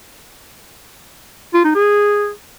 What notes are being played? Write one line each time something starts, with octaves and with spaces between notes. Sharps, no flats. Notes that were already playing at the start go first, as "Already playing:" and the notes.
F4
D#4
G#4